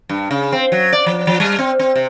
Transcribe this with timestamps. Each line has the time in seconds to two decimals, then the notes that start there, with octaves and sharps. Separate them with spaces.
0.09 G2
0.31 C#3
0.52 C4
0.72 F#3
0.92 D5
1.06 F3
1.27 F3
1.40 G3
1.59 C4
1.79 C4
1.96 C3